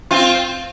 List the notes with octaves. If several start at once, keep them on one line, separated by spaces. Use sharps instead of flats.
C4 F4